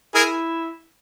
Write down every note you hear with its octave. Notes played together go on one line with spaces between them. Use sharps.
E4 G#4 A#4